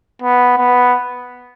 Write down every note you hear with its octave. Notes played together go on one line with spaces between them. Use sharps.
B3
B3